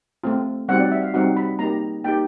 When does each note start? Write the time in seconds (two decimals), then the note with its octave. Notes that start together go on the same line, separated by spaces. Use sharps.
0.24 A3 C4 F4
0.68 G3 C4 D#4 F#4 F#5
0.80 D5
0.92 E5
1.03 F5
1.14 G3 C4 D#4 F#4 F#5
1.37 B5
1.59 A#3 D#4 G4 A#5
2.04 A#3 D#4 G4 G5